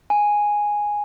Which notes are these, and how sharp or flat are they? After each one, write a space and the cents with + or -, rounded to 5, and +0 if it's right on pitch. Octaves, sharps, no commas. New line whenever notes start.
G#5 -5